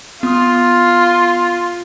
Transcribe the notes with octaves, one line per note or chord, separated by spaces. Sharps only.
B3 F4 D#6